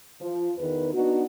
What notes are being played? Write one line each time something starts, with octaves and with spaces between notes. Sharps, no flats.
F3
E2 D#3 B4
B3 D4 D#4 F#4